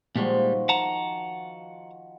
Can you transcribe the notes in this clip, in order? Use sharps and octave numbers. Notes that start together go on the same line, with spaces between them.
A#2 D#3 F3 G3 G#3 F#4
F#5 A5 A#5